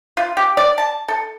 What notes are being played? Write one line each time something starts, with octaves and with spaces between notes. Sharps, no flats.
F4
G4
D5
A5
A4